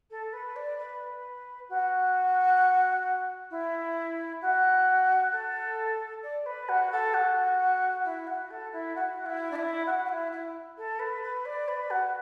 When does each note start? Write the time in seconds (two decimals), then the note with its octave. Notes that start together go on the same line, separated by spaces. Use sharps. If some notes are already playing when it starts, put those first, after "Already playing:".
0.10 A4
0.33 B4
0.56 D5
0.78 B4
1.69 F#4
3.50 E4
4.41 F#4
5.32 A4
6.23 D5
6.46 B4
6.69 F#4
6.91 A4
7.14 F#4
8.04 E4
8.27 F#4
8.50 A4
8.72 E4
8.95 F#4
9.26 E4
9.51 D4
9.55 E4
9.86 F#4
10.05 F#4
10.09 E4
10.31 E4
10.77 A4
10.99 B4
11.23 B4
11.45 D5
11.68 B4
11.90 F#4